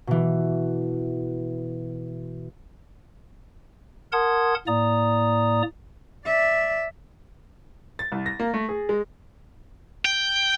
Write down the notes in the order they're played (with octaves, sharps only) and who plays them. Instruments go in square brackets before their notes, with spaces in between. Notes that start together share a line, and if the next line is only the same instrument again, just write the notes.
[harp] B2 E3
[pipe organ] A#4 F#5 A5 C6 D#6 G#6
A2 A#3 D5 A#5 D#6
[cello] D5 E5
[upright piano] A6
C2
A#6
A#3
A3
G#4
G#3
[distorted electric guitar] G5